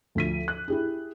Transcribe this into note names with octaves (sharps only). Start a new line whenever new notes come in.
D2 F3 B6 D#7
F#6
E4 G4 G#4